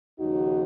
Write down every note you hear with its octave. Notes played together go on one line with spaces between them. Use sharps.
D#2 C#3 F3 D#4 F#4